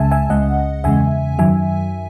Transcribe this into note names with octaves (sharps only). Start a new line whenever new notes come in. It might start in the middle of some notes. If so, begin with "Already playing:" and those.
Already playing: C#2 C#3 G#3 E5 G#5 A5
E5 G#5
C#2 C#3 G#3 D#5 F#5
E2 C#3 G#3 E5 G#5
F#2 D#3 F#3 E5 G#5